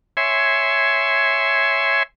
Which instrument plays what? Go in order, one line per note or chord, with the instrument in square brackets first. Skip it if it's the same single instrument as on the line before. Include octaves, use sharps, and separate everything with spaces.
[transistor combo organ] C#5 E5 G#5 C6